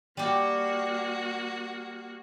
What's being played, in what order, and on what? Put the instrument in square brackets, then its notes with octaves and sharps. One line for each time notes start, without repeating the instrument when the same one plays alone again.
[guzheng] G3 G4 [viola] A#3 F#4